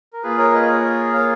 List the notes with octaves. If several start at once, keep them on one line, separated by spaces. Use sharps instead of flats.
A#4
A#3 F4 G#4 B4
A#4 C#5
B4 D#5
A#4 C#5
C#5 F5